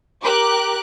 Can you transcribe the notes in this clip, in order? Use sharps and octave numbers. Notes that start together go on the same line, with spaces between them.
G4 A#4 D6 F#6